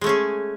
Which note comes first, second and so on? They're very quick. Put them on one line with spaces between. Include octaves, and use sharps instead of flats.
G#3 A3 C#4 G#4